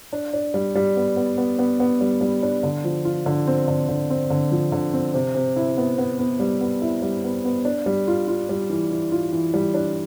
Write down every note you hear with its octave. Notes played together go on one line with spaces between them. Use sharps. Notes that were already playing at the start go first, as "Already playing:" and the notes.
D4
D4
G3
G3
B3
B3
B3
B3
B3
G3
G3
D4
D3
F3
F4
D3
C4
D3
D3
C4
D3
F3
D3
C4
C3
C3
E4
B3
B3
B3
G3
B3
E4
G3
B3
B3
D4
G3
F4
F4
G3
E3
E3
F4
E3
G3
D4